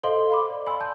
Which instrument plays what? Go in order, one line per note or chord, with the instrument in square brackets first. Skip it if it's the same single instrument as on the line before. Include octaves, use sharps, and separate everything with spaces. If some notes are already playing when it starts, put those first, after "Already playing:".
[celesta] A4 C6 G7 [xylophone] C5 D#5 F5
[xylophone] F5 B5 D6
[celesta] D5
[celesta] D#5 G#5 E6 [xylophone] B5 C6
[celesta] A5 G6